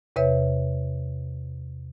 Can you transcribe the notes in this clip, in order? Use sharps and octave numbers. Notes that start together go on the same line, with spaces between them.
E2 C3 B4 C#5 E5